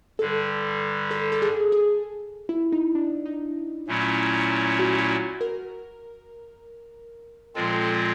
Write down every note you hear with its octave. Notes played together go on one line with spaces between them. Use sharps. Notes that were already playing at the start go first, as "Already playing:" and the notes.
G2 D3 G3 A4
A4
A4
G#4
G#4
E4
D#4
D4
D#4
A#2 F#3 A3 C#4 E4
F#4
A#4
A#2 F3 G#3 C4 F4 A4